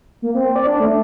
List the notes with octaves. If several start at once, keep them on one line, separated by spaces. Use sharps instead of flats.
A#3
C4
D5
D4
A3